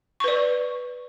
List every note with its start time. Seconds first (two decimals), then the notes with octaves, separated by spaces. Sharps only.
0.20 C#6
0.24 B4
0.28 D5